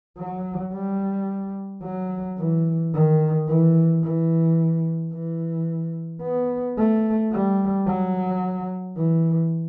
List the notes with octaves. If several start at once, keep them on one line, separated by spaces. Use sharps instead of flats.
F#3
G3
F#3
E3
D#3
E3
E3
E3
B3
A3
G3
F#3
E3